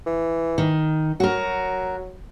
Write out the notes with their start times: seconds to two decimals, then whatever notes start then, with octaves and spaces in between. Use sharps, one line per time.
0.06 E3
0.58 D#3
1.20 F#3 F#4 A#4